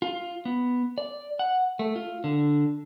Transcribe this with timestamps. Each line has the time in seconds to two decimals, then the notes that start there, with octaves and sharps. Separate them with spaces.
0.02 F4
0.45 B3
0.98 D5
1.39 F#5
1.79 A3
1.96 F4
2.24 D3